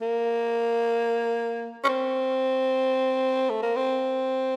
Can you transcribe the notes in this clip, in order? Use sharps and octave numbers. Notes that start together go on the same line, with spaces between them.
A#3
C#4
C4
A3
A#3
C4